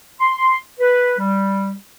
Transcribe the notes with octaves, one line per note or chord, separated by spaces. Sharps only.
C6
B4
G3